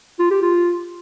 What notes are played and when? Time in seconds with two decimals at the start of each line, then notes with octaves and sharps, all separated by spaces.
0.19 F4
0.30 G4
0.42 F4